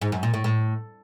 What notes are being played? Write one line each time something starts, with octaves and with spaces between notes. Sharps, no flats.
G#2
F#2
A#2
A2
A2